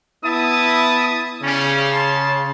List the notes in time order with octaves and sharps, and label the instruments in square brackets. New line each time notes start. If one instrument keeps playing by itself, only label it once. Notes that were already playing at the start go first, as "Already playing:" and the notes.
[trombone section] B3 E4 [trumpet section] E5 A5 D#6
[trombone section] C#3 [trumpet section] G3 C#4
[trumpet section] A5 C6